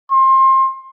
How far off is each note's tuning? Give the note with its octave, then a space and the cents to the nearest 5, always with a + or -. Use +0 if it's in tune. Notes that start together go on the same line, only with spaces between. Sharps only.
C6 +25